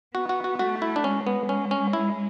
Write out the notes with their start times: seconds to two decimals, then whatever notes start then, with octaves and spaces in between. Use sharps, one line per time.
0.15 B3 F#4
0.29 F#4
0.44 F#4
0.59 A3 F#4
0.82 E4
0.96 D4
1.04 G#3 C#4
1.27 B3
1.49 G#3 C#4
1.71 C#4
1.93 E4